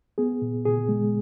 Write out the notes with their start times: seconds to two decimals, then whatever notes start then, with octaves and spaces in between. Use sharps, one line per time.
0.18 B3 G#4
0.42 A#2
0.65 A#2 G#4
0.89 G#3